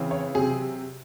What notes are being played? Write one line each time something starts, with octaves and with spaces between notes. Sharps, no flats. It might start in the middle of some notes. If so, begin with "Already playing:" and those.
Already playing: C#3 E3 C4
C#5
C3 F#3 C4 G#4